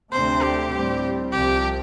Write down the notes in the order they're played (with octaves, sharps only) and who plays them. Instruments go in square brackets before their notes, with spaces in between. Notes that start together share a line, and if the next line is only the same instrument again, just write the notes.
[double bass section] D2 C3 A3 C4 [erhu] C5
[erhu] G4
[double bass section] A2 G3 C4
[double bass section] C2 C3 F3 [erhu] G4